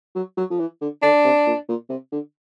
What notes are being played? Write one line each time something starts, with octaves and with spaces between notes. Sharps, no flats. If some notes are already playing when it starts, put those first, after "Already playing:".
F#3
F#3
F3
E3
D3
D3 D4
C3
A#2
A#2
C3
D3